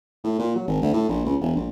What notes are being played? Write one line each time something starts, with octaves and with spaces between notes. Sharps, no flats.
A2
A#2
F#3
G#1
D2
A2
A#1
C#2
E1
A#1